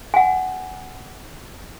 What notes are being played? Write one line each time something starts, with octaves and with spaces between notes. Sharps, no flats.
F#5 G#5